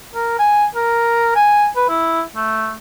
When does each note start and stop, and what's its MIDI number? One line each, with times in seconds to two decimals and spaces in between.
0.15 0.37 70
0.39 0.65 80
0.75 1.35 70
1.35 1.67 80
1.76 1.84 71
1.89 2.21 64
2.36 2.74 57